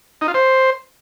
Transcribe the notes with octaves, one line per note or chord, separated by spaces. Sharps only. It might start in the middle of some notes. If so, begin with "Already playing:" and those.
D#4
F4
C5